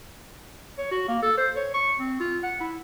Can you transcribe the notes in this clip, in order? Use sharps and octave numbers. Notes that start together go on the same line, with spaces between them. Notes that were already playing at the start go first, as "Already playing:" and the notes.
C#5
F#4
A#3
A4
C5
C#5
C#6
C4
F4
F#5
E4